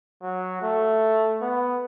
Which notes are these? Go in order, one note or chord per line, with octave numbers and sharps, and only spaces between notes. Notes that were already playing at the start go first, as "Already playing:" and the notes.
F#3
A3
B3